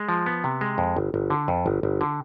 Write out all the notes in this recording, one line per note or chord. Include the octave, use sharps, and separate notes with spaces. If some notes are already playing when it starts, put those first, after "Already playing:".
Already playing: G#3
F3
B3
C3
G#3
F2
G1
G1
D3
F2
G1
G1
D3